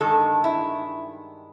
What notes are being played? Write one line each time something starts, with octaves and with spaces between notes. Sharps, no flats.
G2 D#3 G#3 A4
E4